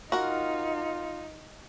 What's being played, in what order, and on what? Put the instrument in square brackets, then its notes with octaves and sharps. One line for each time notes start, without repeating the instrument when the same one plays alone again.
[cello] D#4 [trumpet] F4 [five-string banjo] F#4 A#4